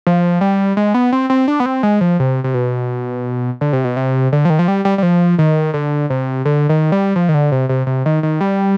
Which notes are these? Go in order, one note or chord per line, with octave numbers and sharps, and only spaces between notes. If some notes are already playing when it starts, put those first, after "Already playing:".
F3
G3
G#3
B3
C4
C4
D4
B3
C4
G#3
F3
C3
C3
B2
D3
C3
B2
C3
D3
F3
D#3
F3
G3
G3
G3
F3
D#3
D3
C3
D3
D#3
G3
F3
D#3
D3
C3
C3
C3
D#3
D#3
G3